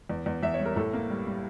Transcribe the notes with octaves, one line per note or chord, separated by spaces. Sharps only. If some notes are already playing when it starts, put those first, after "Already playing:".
E2
E2
E2 E5
C#5
G3
A#4
A2 A4
A#3
G3
G3